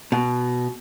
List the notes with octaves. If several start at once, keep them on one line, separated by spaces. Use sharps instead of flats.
B2